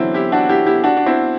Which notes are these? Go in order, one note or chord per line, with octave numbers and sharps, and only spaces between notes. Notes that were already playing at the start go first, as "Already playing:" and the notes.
Already playing: D3 E3 F#3 C4 E4
E4 G4
D4 F#4
E4 G4
E4 G4
D4 F#4
D4
C4 E4